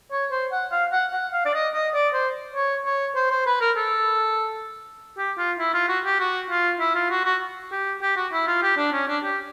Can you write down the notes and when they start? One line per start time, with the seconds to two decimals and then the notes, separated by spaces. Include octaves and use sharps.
0.12 C#5
0.31 C5
0.52 F#5
0.72 F5
0.92 F#5
1.13 F#5
1.33 F5
1.45 D5
1.54 D#5
1.74 D#5
1.94 D5
2.14 C5
2.54 C#5
2.85 C#5
3.15 C5
3.31 C5
3.47 B4
3.61 A#4
3.77 A4
5.18 G4
5.38 F4
5.59 E4
5.74 F4
5.88 F#4
6.05 G4
6.20 F#4
6.50 F4
6.80 E4
6.95 F4
7.10 F#4
7.25 F#4
7.72 G4
8.02 G4
8.16 F#4
8.33 E4
8.47 F4
8.63 G4
8.77 D4
8.92 C#4
9.08 D4
9.23 G4